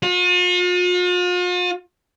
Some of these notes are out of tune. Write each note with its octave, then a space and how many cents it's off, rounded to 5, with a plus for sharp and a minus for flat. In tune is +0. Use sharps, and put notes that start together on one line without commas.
F4 +45